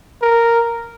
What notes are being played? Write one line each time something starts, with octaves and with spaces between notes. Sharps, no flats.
A#4